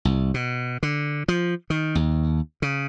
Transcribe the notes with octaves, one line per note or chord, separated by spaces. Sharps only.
C2
B2
D3
F3
D#3
D#2
C#3